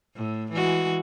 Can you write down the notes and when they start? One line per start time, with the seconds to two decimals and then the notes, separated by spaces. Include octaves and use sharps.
0.16 A2
0.51 E3 G#3 F#4